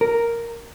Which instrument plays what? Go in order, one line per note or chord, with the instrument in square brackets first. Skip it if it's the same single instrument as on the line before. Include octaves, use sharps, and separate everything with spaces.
[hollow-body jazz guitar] A#4